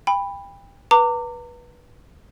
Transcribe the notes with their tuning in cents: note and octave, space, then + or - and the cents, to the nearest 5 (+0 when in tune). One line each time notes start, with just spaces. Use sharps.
G5 +30 B5 +0
B4 -20 A#5 -35 D6 +0